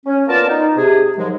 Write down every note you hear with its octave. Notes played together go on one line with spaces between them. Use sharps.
C#4
A#3 B3 F4 A#4 D5 A5
D#4
C3 G#4
G#2 D#3 F3 F#3 G#3